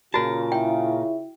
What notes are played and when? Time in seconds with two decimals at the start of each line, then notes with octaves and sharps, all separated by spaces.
0.14 A#2 C#3 F4 F#4 A#4 A5
0.52 E4 E5 G5